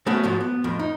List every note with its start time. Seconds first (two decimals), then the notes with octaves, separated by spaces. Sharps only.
0.06 G#3 A3 B3 C#4 F#4
0.23 G#2 F3 F#3
0.41 B3
0.64 F2 A2
0.79 D#4